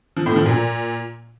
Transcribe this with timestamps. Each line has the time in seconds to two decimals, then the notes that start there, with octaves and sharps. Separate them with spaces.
0.16 F3
0.26 A2
0.36 F3
0.45 A#2